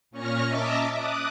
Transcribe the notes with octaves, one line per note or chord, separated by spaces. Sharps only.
A#2 C#4 C#6 F6 A#6
D#5 E5 A5 A#5 D6
D6 D#6 F#6